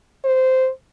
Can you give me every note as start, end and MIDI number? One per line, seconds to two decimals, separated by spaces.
0.24 0.69 72